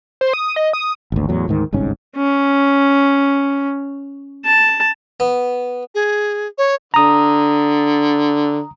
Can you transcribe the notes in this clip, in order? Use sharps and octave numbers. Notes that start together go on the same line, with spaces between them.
C5
D#6
D#5
D#6
G#1 D2
E2 A2 F#3
D2 G#2 D#3
G1 C2 G#2 C#4
C#4
A5
B3
G#4
C#5
D3 A#5 D#6